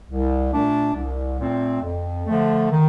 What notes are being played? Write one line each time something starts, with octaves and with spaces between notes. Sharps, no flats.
C2
A#2 A3 D4
C2
A#2 A3 C4
F2
D3 F3 A3
D#3